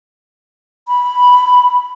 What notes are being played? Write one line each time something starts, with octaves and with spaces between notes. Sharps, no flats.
B5